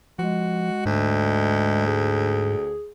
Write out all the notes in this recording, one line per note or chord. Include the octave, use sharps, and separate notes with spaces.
F3 G#3 F#4
D2 G#2
G#4